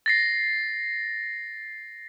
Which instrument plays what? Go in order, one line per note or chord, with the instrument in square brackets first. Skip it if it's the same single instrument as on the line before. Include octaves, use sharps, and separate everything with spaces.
[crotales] A6 A#6 C7